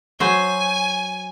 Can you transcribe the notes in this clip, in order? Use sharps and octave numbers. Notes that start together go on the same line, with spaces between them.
F#3 C5 G#5